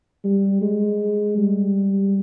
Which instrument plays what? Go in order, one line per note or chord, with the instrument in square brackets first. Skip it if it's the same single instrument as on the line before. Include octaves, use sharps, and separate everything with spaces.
[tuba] G3
G#3
G3